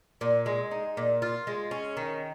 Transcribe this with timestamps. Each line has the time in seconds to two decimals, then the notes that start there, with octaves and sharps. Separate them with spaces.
0.21 A#2
0.46 G#3
0.71 D#4
0.97 A#2
1.22 F4
1.47 G#3
1.71 C#4
1.97 D#3